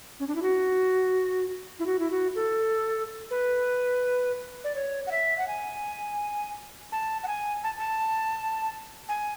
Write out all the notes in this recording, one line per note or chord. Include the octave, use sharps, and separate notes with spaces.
C#4
D4
E4
F#4
E4
F#4
E4
F#4
A4
B4
D5
C#5
F#5
E5
F#5
G#5
A5
F#5
G#5
A5
A5
G#5